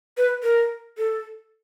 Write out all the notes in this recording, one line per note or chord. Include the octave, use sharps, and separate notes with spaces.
B4
A#4
A4